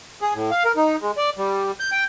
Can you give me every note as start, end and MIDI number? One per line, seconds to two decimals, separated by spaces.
0.22 0.34 68
0.34 0.51 45
0.51 0.63 77
0.65 0.72 70
0.76 0.96 63
1.01 1.11 56
1.17 1.30 74
1.38 1.71 55
1.80 1.90 91
1.92 2.04 79